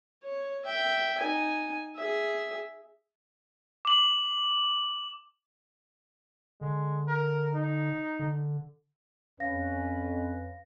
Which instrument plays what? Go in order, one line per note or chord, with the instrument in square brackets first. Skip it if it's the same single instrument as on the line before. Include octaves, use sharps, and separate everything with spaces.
[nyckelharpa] C#5
E5 G5
D#4 G#5
G#4 E5
[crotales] D6 F#7
[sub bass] D3 [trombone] G#3
[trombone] A#4
D#4
[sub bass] D3
[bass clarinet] F2 [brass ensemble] C#4 B4 [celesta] F5 A#6